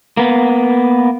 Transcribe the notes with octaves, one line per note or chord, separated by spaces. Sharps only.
A#3 B3